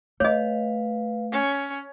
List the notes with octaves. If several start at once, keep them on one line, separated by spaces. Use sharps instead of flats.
A3 B4 C#5 D#5 F5
C#4